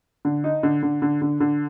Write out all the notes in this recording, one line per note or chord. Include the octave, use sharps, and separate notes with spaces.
D3
D#4
D3
D3
D3
D3
D3